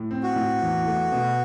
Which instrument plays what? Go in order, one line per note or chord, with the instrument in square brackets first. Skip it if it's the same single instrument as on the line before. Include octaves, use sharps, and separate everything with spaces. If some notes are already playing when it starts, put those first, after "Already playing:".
Already playing: [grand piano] A2
C4
[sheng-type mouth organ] F#4
[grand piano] A2
E2
A3
B2